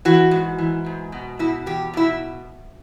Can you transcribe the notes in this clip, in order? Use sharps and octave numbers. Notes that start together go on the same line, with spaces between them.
E3 F#4
G#2
E3
G#2
B2
B2 E4
E2 G4
B2 E4